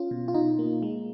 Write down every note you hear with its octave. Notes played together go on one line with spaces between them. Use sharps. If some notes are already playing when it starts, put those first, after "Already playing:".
Already playing: C#4 F4
B2
F4
B2 D#4
A#3
G#3